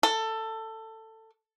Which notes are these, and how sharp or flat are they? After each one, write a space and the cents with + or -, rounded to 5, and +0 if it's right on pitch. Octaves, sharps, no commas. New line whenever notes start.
A4 +15